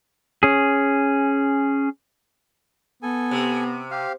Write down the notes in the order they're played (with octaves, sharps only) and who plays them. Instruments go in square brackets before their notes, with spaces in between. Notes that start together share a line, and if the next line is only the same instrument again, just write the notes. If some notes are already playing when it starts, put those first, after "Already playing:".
[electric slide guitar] C#4 G#4
[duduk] B3 [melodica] A4 G#5
[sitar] C3
[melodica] G4 F5